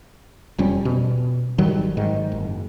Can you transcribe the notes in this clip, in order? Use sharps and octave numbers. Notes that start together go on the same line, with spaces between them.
E1 F2 G3 C#4
B2
G#1 D#3 F#3 G3
G#2 D#3
F#1